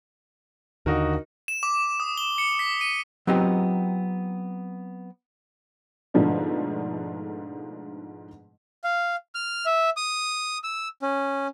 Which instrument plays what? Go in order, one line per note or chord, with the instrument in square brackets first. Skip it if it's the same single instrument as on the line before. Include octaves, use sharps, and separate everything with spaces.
[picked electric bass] D#2 D3 [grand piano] D#4 F#4 A#4
[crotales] E7
D6
D#6
G7
C#7
B6
D#7
[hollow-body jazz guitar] F#3 B3 C4 D#4 F4 G4
[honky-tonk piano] G#2 B2 D3 F3 A3 D4
[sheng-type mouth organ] F5
F6
E5
D#6
E6
C#4